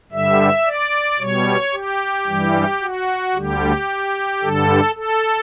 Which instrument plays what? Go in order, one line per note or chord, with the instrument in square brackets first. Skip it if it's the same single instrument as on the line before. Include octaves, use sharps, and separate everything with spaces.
[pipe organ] G2 D3 G3 E5
D5
B2 G3 C#5
G4
G2 E3 G3
F#4
D2 D3 G3 G4
G2 D3 G3 A4
A4